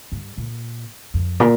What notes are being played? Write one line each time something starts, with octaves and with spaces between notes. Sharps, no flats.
G2
A#2
F2
A#2